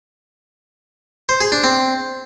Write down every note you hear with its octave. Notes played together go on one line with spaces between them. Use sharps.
C5
G#4
D4
C4